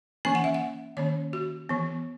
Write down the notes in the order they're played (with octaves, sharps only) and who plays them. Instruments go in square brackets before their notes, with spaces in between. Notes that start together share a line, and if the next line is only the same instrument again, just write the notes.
[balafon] E3 A#3 C#4 G#5
F#5
E5
F#5
D#3 A#3 C#4 C#5
F#4
E3 B3